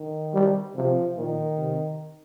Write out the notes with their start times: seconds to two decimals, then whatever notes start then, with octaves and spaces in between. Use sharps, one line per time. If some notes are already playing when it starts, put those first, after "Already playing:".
Already playing: D#3
0.34 G3
0.75 C3 F3
1.16 A#2 D#3
1.58 C3